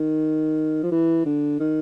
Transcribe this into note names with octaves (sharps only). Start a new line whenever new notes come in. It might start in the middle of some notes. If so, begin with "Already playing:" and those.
Already playing: D#3
F3
E3
D3
D#3